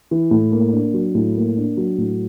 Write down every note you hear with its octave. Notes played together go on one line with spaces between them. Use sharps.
E3
A2
A#3
D4
F#3
A2
A#3
D4
F#3
A2